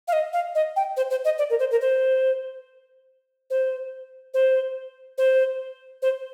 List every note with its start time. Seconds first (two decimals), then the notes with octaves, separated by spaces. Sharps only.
0.08 F5
0.13 D#5
0.33 F5
0.55 D#5
0.76 G5
0.97 C5
1.11 C5
1.25 D#5
1.38 D5
1.50 A#4
1.59 C5
1.71 A#4
1.81 C5
3.50 C5
4.34 C5
5.18 C5
6.02 C5